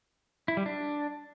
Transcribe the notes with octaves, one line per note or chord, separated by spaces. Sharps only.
E4
G3
D4